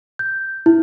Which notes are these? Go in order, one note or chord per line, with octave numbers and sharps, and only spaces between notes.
G6
E4